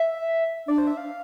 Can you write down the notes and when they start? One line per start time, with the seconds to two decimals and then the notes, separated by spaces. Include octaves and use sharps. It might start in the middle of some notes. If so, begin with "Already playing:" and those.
Already playing: E5
0.68 D4 D5
0.78 C5
0.87 E5
0.97 F5